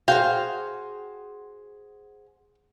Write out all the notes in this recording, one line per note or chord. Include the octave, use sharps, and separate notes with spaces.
F#4 G#4 C5 F5 G5